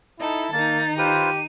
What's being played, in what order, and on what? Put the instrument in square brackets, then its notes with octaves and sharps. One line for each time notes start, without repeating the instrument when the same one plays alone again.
[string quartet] D#4 A4 A5 [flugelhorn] E4
[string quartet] D#3 D#4 [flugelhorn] A#3 [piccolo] A6
[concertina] F4 B4 C5 [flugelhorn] G4 [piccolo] D#7